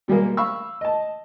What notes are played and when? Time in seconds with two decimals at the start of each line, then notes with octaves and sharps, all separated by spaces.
0.08 B2 G3 G#3 A#3
0.37 F5 B5 C#6 E6
0.81 D#5 A5